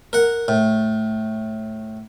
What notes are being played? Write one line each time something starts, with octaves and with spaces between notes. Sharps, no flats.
A#4 F#5
A2